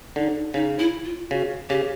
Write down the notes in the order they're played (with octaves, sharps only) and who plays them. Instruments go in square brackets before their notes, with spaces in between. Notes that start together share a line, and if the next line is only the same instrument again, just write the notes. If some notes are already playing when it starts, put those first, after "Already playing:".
[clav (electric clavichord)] D3 [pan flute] D#4
[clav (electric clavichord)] C#3 [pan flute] D#4
[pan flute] E4
F4
[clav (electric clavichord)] C#3 [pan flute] F#4
[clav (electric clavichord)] C#3 [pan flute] G4